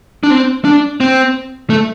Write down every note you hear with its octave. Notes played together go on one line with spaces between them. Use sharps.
D4
C4
D4
C4
A3